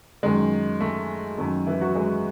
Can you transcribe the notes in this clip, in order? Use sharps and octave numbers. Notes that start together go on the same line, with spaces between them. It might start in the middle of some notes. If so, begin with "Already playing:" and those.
F#2 D#3 G#3
A3
F#2 D#3 A3
E3 E4
F#3 F#4
G#3 G#4